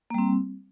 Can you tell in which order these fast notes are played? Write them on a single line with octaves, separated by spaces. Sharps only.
A#3 G3 C4